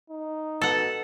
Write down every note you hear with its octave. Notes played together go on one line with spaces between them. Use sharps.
D#4
B2 A4 F#5